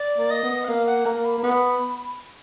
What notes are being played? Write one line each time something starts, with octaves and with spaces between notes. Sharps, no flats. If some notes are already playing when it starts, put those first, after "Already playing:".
Already playing: D5
A#3
D#5
B3
F#5
A#3 F5
F#5
A#3 A#5
B5
A#3
B3